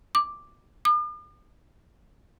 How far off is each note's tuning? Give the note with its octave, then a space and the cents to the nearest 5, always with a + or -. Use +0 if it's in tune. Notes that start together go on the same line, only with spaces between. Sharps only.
D6 +5
D6 +45